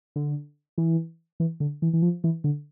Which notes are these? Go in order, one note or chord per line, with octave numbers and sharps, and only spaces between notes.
D3
E3
E3
D3
E3
E3
F3
E3
D3